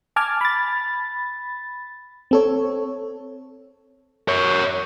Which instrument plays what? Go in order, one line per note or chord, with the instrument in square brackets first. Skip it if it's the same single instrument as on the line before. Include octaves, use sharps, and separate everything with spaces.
[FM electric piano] G#5 A5 D6 F6 G#6 A6
B5 A6
C4 A4 C#5
[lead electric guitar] A#4 C#5